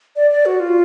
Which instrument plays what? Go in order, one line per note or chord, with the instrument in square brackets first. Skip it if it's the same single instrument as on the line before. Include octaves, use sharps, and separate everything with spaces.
[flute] D5
D5
F#4
F4